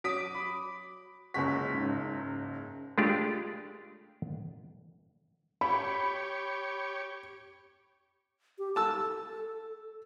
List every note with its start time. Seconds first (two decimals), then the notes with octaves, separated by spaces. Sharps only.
0.04 F#3 D6 D#6 B6 D7
0.34 B5
1.34 F#1 C#2 G#3 F#4 B6
1.74 G#2 C#3
2.98 G#3 A3 D4 F4 G4 D5
5.61 G4 C#5 B5
8.58 G4
8.76 A4 A5 E6